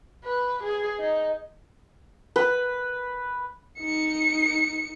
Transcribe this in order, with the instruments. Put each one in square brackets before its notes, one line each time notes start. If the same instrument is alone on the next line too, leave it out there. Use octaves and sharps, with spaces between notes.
[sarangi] B4
G#4
D#4
[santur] B4
[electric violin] D#4 C#7